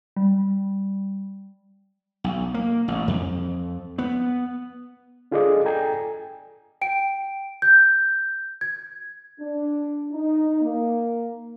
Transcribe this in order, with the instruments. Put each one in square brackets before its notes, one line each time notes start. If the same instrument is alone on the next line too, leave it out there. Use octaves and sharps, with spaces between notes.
[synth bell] G3
[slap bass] B1
A#3
A1
F2
B3
[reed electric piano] D4 F4 G#4 A4 D5 D#5
A4 G5 G#5 A#5
[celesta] G5 D7
G6
G#6
[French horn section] D4
D#4
A#3